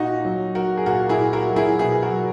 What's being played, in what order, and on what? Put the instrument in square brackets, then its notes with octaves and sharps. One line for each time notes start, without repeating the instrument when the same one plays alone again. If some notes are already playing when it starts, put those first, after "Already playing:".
Already playing: [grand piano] A#2 D#4 F#4
F#3
F#3 F#4 A#4
G#4
A#2 F#4 A#4
E4 G#4
A#2
F#4 A#4
F#3
E4 G#4
B2 E4 G#4
F#4 A#4
F#3